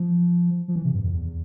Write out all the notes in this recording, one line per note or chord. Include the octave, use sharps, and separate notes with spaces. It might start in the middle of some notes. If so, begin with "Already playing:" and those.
Already playing: F3
F3
E3
C3
G2
F2
E2